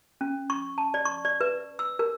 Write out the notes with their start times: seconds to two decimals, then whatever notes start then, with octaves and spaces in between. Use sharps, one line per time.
0.21 C#4
0.50 C#6
0.78 A5
0.94 D5
1.05 C#6
1.25 D5
1.41 B4
1.79 E6
1.99 A#4